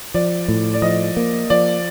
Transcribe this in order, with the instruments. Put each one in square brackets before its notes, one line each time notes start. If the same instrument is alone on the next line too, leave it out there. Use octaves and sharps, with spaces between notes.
[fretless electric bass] F3 [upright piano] D5
[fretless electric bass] A2
[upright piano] D5
[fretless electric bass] F3 [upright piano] D#5
[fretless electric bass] A#3
[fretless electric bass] F3 [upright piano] D5